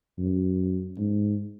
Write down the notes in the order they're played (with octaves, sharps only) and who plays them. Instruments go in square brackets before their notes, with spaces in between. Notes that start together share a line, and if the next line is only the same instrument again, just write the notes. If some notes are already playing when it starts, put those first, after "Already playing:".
[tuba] F#2
G#2